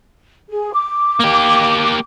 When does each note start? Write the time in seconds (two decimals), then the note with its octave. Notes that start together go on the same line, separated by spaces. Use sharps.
0.50 G#4
0.73 D6
1.20 A#3 G4